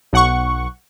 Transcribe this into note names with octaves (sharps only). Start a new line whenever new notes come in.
B1 F#5 C#6